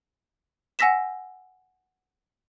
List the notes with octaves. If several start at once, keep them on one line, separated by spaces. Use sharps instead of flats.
F#5 G#5 E6 A#6 B6 E7